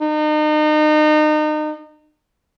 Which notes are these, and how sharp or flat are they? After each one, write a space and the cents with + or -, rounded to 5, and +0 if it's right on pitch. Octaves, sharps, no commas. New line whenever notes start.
D#4 -35